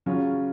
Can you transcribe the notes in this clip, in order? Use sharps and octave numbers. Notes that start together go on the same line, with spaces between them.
C#3 F#3 C#4 F4